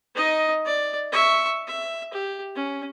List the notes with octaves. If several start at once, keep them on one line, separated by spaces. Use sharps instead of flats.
D#4 D#5
D5
E5 C#6
E5
G4
C#4